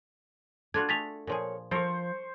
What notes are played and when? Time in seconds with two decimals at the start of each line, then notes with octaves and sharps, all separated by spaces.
0.74 D4 F4 F#4 A4 G#6
0.89 A3 G#4 A6 B6 F7
1.27 A#2 F3 G#4 A#4 C#5
1.71 F3 A4 A#4 C5 C#6